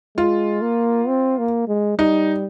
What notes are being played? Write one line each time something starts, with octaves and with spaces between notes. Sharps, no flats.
G#3 F4
A#3
C4
A#3
G#3
G3 D#4